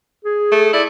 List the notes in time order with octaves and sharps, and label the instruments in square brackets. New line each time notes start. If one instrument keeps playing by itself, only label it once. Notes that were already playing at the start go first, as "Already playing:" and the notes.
[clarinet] G#4
[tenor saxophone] A3
[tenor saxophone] E4 [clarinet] D5